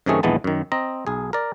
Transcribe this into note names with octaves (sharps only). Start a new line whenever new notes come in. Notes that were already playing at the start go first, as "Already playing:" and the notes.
F#2 C3 D#3 A3 G#4 C#5
A#1 D#2 E3 G#3 B3 A5
F#2 D#3
C4 D#5 A#5
B1 G#4
A#4 D5